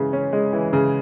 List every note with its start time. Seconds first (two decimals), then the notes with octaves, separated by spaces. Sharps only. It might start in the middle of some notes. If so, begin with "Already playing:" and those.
Already playing: C#3 E3 G#3
0.13 C#4
0.33 G#3
0.53 E3
0.73 C#3